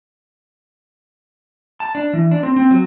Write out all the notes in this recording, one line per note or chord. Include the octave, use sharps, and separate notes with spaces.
A5
D4
E3
D4
C4
C4
F#3